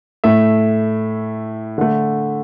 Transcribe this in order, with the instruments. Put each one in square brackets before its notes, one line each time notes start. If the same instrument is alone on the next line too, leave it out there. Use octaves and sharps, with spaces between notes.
[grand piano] A2 A3 E5
D3 A3